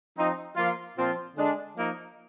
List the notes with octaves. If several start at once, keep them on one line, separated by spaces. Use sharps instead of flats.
F3 C4 D#4
F3 A#3 F4
A#2 F3 C4 F4
D3 G#3 D4
F3 A#3 D#4